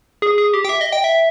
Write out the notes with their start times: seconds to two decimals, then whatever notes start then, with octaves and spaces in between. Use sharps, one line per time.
0.22 G#4
0.38 G#4
0.53 G4
0.65 G5
0.69 E5
0.81 D#5
0.92 G5
1.04 E5